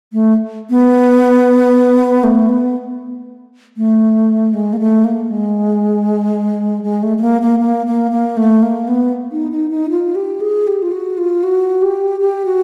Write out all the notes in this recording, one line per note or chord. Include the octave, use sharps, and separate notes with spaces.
A3
B3
A3
B3
A3
G#3
A#3
A3
A#3
G#3
G#3
A3
A3
A#3
A#3
A#3
A#3
A#3
A3
A#3
B3
D#4
D#4
D#4
F4
G4
G#4
G4
F4
F#4
F4
F#4
G4
G4
F#4